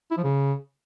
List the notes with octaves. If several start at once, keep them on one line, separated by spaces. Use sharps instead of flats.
E4
F3
C#3